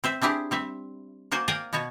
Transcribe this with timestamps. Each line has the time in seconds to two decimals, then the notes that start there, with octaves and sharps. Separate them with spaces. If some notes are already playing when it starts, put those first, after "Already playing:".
0.04 C4 C5 E5
0.22 C4 D4 E4 G4 G#4
0.51 G3 C4 E5
1.31 A#3 F#4 C5 D5 G#5
1.48 A#4 D5 F5 G5 G#5 A#5
1.73 B2 B3 F#4 C#5